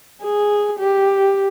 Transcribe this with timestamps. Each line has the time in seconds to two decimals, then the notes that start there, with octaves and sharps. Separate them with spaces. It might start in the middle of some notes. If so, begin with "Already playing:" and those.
0.23 G#4
0.79 G4